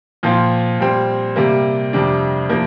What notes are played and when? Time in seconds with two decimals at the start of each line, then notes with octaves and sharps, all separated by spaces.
0.23 A#2 F3 C4 F4
0.79 A#2 G3 C4
1.36 C3 G3 A#3
1.93 F2 C3 G3 D4
2.50 C3 F3 A#3